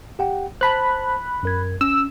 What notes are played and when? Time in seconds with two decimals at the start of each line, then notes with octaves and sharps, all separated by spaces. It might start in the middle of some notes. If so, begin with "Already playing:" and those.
0.19 G4 F#5 G5
0.61 C5 A5 B5 F#6
1.43 F#2 A#4 G#6
1.81 C#4 E6